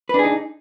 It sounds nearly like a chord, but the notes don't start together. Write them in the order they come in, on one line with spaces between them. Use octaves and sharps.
B4 D4 G#4 D#4